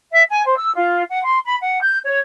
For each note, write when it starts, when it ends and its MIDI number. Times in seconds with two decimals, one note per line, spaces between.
0.11 0.23 76
0.29 0.42 80
0.45 0.53 72
0.57 0.73 88
0.75 1.02 65
1.10 1.22 78
1.24 1.38 84
1.44 1.55 83
1.61 1.80 78
1.81 1.99 91
2.05 2.19 73